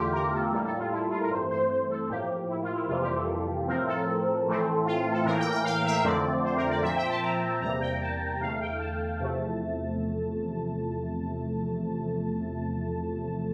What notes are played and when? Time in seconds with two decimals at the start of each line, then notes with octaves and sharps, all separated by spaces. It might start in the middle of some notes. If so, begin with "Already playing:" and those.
Already playing: E2 D3 A3 F4 G4
0.13 A#4
0.33 A4
0.52 A2 G3 A#3 A4
0.65 A4
0.78 F4
0.92 E4
1.11 F4
1.21 A#4
1.31 G2 E3 A3 C4 C5
1.51 C5
1.70 C5
1.90 A4
2.10 A2 F3 A#3 G4
2.29 G4
2.49 E4
2.63 F4
2.75 E4
2.89 F2 C3 E3 G3 A#3 F4
3.02 G4
3.16 A4
3.67 A2 F3 C4 A#4
3.87 A4
4.47 A2 E3 A3 C4
4.86 F4
5.12 A4
5.25 A2 E3 A#3 A#4
5.39 G5
5.52 G5
5.64 F5
5.85 E5
6.04 F2 D3 A3 C4 D5
6.44 C5
6.56 A#4
6.70 D5
6.82 A#2 F3 C4 E5
6.96 G5
7.09 A5
7.23 A#5
7.62 E2 C3 G3 A#3 A#5
7.81 G5
8.01 A5
8.41 E2 D3 A3 F5
8.61 G5
8.79 A5
9.19 E2 C3 F3 A3